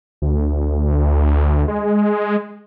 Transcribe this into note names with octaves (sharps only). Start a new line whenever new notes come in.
D2
G#3